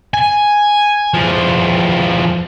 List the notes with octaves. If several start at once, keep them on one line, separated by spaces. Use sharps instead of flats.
G#5
E2 F3